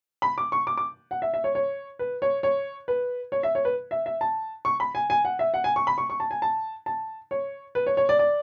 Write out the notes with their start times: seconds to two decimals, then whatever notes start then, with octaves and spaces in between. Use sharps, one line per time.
0.22 B5
0.38 D6
0.52 C#6
0.67 D6
0.77 D6
1.11 F#5
1.22 E5
1.34 E5
1.44 C#5
1.55 C#5
1.99 B4
2.22 C#5
2.43 C#5
2.88 B4
3.32 C#5
3.43 E5
3.55 C#5
3.65 B4
3.91 E5
4.06 E5
4.21 A5
4.65 C#6
4.80 B5
4.95 G#5
5.10 G#5
5.25 F#5
5.39 E5
5.54 F#5
5.64 G#5
5.76 C#6
5.87 B5
5.98 C#6
6.10 C#6
6.20 A5
6.31 G#5
6.42 A5
6.86 A5
7.31 C#5
7.75 B4
7.87 C#5
7.97 C#5
8.09 D5
8.19 D5